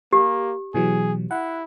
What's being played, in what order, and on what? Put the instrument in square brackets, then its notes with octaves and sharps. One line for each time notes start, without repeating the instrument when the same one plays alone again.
[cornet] A#3 [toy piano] G4
[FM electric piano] B2 E3 F#3 [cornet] G#4
[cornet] E4 [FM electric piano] F#5